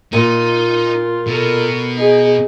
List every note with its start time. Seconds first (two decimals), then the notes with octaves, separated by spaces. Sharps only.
0.13 A#2 D#4 F4
1.27 B2 A4 A#4
1.96 D#4 G#4